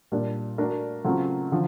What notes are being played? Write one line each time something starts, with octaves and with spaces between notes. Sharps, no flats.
A#2 G3 A#3 D4
A3 D4 F#4 A#4
C#3 F#3 A3 C4 F4
D3 F3